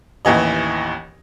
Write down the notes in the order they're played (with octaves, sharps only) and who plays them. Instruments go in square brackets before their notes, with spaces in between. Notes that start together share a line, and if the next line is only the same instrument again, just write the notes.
[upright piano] A1 D#2 E3 D#5